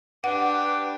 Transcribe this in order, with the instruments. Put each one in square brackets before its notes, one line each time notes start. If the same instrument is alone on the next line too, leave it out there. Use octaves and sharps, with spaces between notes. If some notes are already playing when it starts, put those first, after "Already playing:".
[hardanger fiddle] D4 G4 [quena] B4 [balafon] F#5 [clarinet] D6